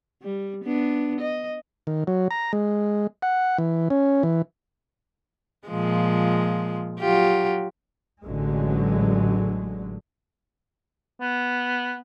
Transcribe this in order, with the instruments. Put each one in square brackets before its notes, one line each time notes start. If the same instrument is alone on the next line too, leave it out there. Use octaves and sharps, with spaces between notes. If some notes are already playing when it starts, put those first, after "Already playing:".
[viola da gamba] G3
B3 D4
D#5
[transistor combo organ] D#3
F#3
A#5
G#3
F#5
E3
C#4
E3
[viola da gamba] A#2 F3 G#3
F#3 F4 G4
[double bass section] A1 D3 F#3 G#3
[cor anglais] B3